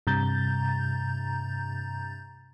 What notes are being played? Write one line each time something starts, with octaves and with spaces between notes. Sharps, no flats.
G2 C3 A#5 G6 A6